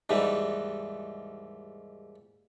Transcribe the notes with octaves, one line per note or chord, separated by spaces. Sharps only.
D#2 G#2 E3 G3